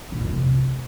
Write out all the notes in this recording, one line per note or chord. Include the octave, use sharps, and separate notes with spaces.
A#2
F2
C3